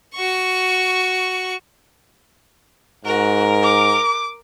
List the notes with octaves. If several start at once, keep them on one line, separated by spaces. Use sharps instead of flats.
F#4 C#6
G#2 F#4 A#4
D6